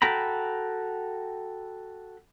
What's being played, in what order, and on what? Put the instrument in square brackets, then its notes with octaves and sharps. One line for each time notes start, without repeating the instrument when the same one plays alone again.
[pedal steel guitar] F#4 A4 G5 A#5 B5